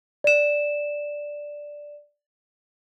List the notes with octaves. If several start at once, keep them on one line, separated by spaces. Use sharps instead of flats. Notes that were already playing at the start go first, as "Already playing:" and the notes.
D5 E7